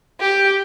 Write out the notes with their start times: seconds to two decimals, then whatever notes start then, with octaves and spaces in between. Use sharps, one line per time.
0.20 G4